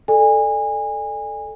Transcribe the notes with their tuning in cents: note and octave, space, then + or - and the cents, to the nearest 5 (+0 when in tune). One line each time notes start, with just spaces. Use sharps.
A4 +0 D5 +20 G#5 -25